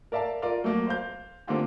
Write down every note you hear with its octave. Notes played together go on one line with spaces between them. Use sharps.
A#4 D5 E5 F5 A5
F4 A#4 D5
F#3 A3 A#3
C5 F5 G6
D3 A#3 C4 F4 G4